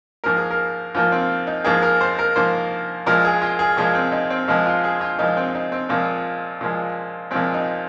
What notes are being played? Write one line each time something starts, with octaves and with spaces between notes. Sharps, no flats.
G#2 F3 A#3 A#4
G#4
A#4
G#2 F3 A#3 F4
C4
D#4
G#2 F3 A#3 G#4
A#4
C5
A#4
G#2 F3 A#3 C5
A#2 F3 G#3 A#4
G#4
F4
G#4
A#2 F3 G#3 G#4
C4
D#4
C4
A#2 F3 G#3 D#4
F4
G#4
F4
A#2 F3 G#3 D#4
C4
D#4
C4
A#2 F3 G#3 C4
A#2 F3 G#3
A#2 F3 G#3 C4
D#4